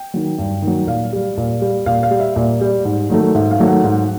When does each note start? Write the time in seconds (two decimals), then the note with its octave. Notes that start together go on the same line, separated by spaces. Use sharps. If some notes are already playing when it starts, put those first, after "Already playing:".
Already playing: G5
0.14 D#3 F#3
0.38 G2
0.62 D#3 F#3
0.87 A#2 F5
1.13 G3
1.37 A#2
1.62 G3
1.86 A#2 F5
2.03 F5
2.11 G3
2.20 E5
2.36 A#2
2.61 G3
2.85 G#2
3.10 D#3 F#3 A3
3.35 G#2 E5
3.51 F5
3.59 D#3 F#3 A3
3.68 F#5
3.84 G#2